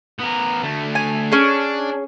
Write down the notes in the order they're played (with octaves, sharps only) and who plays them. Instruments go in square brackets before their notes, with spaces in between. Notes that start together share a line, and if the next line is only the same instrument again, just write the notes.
[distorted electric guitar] B3 A#4
D2 A3
[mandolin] G#5
[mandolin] C#4 G#4 [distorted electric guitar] D4